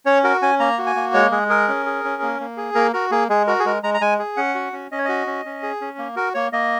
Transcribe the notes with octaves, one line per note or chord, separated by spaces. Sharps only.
C#4 C#5
F#4 A#4
C#4 G#5
A#3 A#5
F#4
G#5
A#3
G#3 C#5
G#3 G#4
G#4 A#4
C#4
G#4
C#4
A#3
A#3
G#4
A#3 A#4
F#4 A#4
A#3 G#4
G#3 G#4
F#4 A#4
G#4
G#3 A#4
G#3 A#5
A#5
G#3 G#5
G#4
C#4 F#5
F#4
C#4
C#4 D#5
C#5
F#4 D#5
C#4
C#4
G#4
C#4
A#3
F#4 A#4
A#3 C#5
A#3 D#5